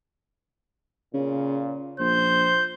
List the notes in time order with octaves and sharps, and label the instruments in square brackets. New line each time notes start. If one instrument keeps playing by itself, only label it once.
[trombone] A#2 [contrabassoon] C#3
[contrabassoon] A#1 [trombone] C5 [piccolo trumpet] G6